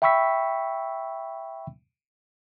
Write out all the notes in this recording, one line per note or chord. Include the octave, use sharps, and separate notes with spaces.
E5 G5 B5 C#6 E6 B6